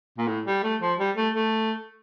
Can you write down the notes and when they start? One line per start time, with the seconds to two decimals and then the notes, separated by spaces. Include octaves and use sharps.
0.18 A#2
0.27 A2
0.46 G3
0.63 A3
0.81 F3
0.99 G3
1.16 A3
1.34 A3